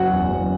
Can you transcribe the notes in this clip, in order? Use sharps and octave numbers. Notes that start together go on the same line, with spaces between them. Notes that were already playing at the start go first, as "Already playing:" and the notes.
Already playing: F#1 F#4 F#5
E2
F#1